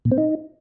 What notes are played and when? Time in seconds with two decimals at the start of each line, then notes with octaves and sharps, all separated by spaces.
0.05 A#2
0.12 C4
0.18 D#4